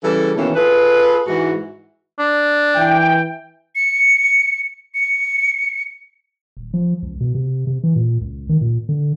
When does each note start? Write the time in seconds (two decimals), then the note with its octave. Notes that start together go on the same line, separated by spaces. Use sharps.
0.04 C#3 E3 G3 A4
0.37 B2 D#3 E3 A3 A#3 C#4
0.56 F4 G#4 A4 B4
1.27 G#2 E3 F#4
2.19 D4
2.75 E3 G5
3.75 C#7
4.94 C#7
6.57 D#1
6.74 F3
7.03 C#2
7.21 B2
7.35 C3
7.67 C3
7.83 E3
7.96 A#2
8.21 C#2
8.49 D#3
8.61 A#2
8.89 D3